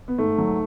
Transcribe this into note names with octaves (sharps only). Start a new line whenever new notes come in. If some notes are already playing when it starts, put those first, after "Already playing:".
B3
G#2 A3
F#3